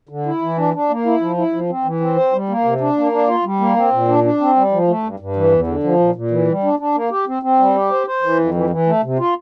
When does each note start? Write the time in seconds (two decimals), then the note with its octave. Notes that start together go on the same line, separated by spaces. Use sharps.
0.09 D3
0.26 E4
0.42 E3
0.57 D4
0.74 D4
0.89 A#3
1.06 E4
1.21 F3
1.37 E4
1.53 F3
1.70 C4
1.84 E3
2.00 C4
2.16 C5
2.33 G3
2.49 A#3
2.64 C3
2.80 D4
2.97 A#3
3.12 D4
3.28 F4
3.44 G3
3.60 A#3
3.76 C4
3.92 A#2
4.08 D4
4.24 D4
4.41 C4
4.56 G3
4.72 F3
4.88 A3
5.03 G2
5.20 G2
5.36 E3
5.52 E2
5.67 D3
5.83 F3
6.00 A#2
6.15 A#2
6.31 E3
6.48 G3
6.63 D4
6.79 D4
6.95 A#3
7.10 G4
7.27 C4
7.43 C4
7.59 G3
7.75 G4
7.91 C5
8.07 C5
8.22 E3
8.38 F2
8.54 E3
8.70 E3
8.86 A3
9.03 C3
9.19 F4